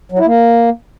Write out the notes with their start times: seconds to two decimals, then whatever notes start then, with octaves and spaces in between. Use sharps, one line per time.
0.12 F#3
0.19 E4
0.26 A#3